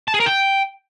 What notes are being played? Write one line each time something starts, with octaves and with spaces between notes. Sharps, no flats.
A5
G#4
A#4
G5